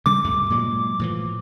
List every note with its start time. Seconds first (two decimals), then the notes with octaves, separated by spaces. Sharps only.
0.06 C#3 G3 D6
0.24 D2 G2 A3
0.50 A#2 F#3 G#3
0.99 A2 E3 F3